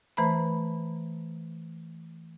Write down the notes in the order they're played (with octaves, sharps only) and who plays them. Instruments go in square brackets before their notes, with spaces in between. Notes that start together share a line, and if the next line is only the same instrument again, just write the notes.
[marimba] E3 A3 B4 C5 A#5 B5